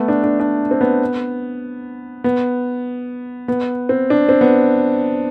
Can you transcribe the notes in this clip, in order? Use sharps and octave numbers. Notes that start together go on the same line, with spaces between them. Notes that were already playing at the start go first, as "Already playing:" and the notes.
Already playing: A3 B3
D4
D4
D4
C4
B3
B3
B3
C4
D4
C4
B3